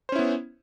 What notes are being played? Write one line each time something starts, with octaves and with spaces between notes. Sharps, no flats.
B3 C#4 E4 C5